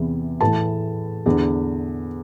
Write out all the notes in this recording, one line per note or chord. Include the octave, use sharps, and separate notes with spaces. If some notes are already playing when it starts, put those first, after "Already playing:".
Already playing: E2 C3 E3
A2 E3 A5
E2 D3